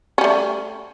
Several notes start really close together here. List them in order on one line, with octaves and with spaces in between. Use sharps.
C#4 G3 A3